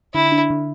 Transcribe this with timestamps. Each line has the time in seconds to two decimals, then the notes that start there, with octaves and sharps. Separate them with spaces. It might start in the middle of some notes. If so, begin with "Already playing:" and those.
0.14 D3 E4
0.32 D4
0.50 D3